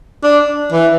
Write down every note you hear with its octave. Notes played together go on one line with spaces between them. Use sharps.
D4
E3